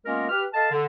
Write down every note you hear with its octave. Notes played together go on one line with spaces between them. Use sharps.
G#3 A#3 B3 C#4 F4 A#4
G4 B4 F6
A4 D#5 F5 A5
D3